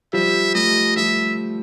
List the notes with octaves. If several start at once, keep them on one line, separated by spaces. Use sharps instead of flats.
F3 G3 E5
G3 A3 D#5
F3 G3 E5